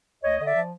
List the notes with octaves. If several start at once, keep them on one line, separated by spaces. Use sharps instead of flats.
D2 C#5 D#5
D3 D#5
D5 E5
F3